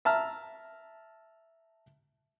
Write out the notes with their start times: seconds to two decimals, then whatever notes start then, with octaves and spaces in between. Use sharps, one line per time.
0.05 E5 A5 A#5 F6